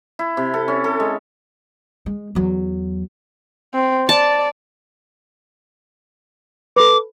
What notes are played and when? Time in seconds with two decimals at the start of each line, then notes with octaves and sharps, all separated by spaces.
0.19 E4
0.37 C3
0.54 A4
0.68 C#4
0.84 A4
1.00 G#3
2.06 G#3
2.35 E2 F#3
3.74 C4
4.09 D5 A5
6.76 A4 B4 D6